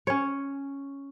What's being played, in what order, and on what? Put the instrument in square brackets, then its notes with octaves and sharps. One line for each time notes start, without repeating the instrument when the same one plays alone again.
[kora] C#4 C#5